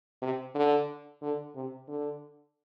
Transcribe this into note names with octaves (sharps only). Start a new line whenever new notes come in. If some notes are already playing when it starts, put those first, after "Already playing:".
C3
D3
D3
C3
D3